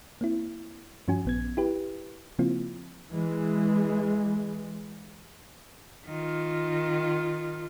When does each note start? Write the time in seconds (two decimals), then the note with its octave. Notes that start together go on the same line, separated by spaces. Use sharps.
0.21 A#3 C4 E4
1.08 G2 F3 C#4 F#4 G#5
1.25 A#1 B3 G#6
1.57 E4 G4 B4
2.39 C#3 F3 A#3 C4 E4 F4
3.11 E3 G#3
6.07 D#3 F4